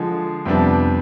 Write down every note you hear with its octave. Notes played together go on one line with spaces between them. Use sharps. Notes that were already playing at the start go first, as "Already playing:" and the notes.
Already playing: D3 F3 G#3
F2 C3 G3 B3 D4